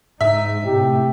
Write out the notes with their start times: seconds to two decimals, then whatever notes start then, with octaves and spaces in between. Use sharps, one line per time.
0.21 G#2 D#4 E5
0.66 A2 C3 G4